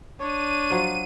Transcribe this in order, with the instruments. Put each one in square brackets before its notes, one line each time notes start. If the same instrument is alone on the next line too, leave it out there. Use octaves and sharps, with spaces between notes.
[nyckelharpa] D4 [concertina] C#5 [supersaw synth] D#7
[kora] F3 F#3 F5